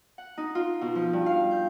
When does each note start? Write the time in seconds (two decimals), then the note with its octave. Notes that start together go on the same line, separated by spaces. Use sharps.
0.18 F#5
0.38 D#4
0.55 F4
0.81 B2
0.95 F3
1.13 G2
1.26 F5
1.51 G6